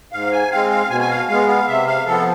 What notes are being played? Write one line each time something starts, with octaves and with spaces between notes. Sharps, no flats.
G#2 F5
G#5
G#3 C4 F5
F5
B2 G#5
G#5
F5
G#3 B3 F5
F5
C3 E5
F5
F3 B3 A4